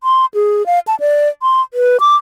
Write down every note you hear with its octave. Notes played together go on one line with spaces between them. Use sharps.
C6
G#4
F5
A5
D5
C6
B4
D6